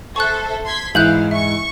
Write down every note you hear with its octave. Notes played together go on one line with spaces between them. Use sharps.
A4 C5 E5 C#6 F#6
C6 G#6 B6
G#2 E3 E4 F5 F#6 G6 F#7
E5 C#6